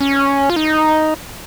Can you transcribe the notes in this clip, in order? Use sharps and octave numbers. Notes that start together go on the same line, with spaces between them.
C#4
F4
D#4